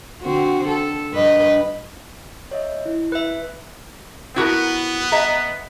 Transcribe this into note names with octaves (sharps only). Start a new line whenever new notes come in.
D3 C4 F#4
A4
G2 B4 D#5
C#5 D#5 E5
E4
B4 E5
B3 E4 F#4 A#4
D#5 E5 A#5